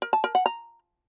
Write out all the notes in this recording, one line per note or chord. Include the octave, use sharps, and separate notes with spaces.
A#4
A5
A#4
F#5
A#5